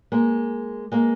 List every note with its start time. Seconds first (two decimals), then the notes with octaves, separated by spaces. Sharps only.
0.12 G#3 A#3
0.92 G#3 A#3